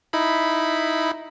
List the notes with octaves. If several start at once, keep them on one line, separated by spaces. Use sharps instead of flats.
D#4 E4 B5